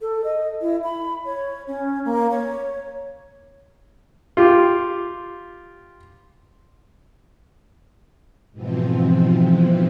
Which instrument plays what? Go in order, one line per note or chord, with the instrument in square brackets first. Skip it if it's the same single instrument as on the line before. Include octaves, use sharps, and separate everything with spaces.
[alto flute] A4
D#5
E4
B5
C#5
C#4
A#3
C#5
[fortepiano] F4 G4
[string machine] G#2 B2 E3 F3 C4